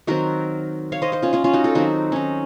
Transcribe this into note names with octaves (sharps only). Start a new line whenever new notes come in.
D#3 F#3 C4 F#4 A#4
C#5 F5
C5 D#5
C5 D#5
C#4 F4
C#4 F4
C#4 F4
D#4 F#4
F4 A4
D#3 F#3 C4 D#4 F#4
C#4 D#4